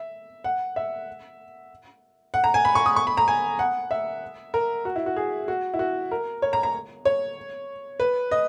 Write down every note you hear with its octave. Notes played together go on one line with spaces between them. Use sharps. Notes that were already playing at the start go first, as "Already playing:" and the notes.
Already playing: E5
F#5
E5
F#5
A#5
G#5
B5
C#6
D#6
C#6
B5
A#5
G#5
F#5
E5
A#4
F#4
E4
F#4
G#4
F#4
E4
F#4
A#4
C#5
A#5
A#5
C#5
B4
D#5